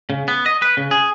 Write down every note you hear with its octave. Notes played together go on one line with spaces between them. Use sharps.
C#3
B3
D#5
B4
C#3
G#4